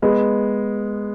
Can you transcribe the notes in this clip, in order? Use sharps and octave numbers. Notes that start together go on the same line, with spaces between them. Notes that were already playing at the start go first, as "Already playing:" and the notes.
G#3 B3